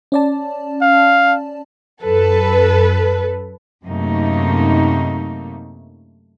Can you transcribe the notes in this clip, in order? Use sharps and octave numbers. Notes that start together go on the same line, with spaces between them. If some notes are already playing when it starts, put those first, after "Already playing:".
C#4 D5 A5
F5
F#2 A4 B4
F#2 C3 A3 A#3 D#4